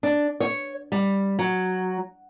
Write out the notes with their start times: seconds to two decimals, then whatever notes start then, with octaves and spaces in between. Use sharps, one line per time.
0.03 D4
0.40 C#5
0.92 G3
1.39 F#3